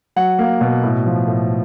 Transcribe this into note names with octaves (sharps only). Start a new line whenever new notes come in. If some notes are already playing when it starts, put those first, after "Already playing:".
F#3 F#5
A#3
B2
A2
F3
A2